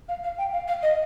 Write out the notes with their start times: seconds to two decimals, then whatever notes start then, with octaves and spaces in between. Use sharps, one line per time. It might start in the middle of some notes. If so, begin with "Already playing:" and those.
0.09 F5
0.24 F5
0.38 G5
0.53 F5
0.68 F5
0.83 D#5